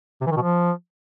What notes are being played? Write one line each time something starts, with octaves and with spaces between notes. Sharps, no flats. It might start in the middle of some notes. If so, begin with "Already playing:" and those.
C3
E3
D#3
B2
F3